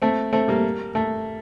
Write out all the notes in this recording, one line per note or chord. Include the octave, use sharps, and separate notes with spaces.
A3 C4
A3 C4
G3 A#3
A3